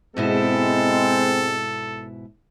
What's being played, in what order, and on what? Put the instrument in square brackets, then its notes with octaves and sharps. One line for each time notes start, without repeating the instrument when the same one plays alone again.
[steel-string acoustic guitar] G#2 B2 E4 [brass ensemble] G#3 C4 [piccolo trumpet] A4